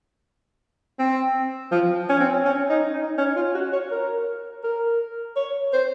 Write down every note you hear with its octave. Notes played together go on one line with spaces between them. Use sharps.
C4
F3
C#4
C4
C#4
D#4
D#4
C#4
F4
F#4
C#5
A#4
A#4
C#5
C5